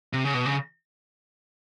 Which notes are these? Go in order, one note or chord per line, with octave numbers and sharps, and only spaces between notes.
C3
C#3
B2
C#3